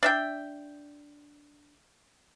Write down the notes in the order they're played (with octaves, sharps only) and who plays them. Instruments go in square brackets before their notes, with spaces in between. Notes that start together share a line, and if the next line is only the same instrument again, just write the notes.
[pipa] D4 E5 G5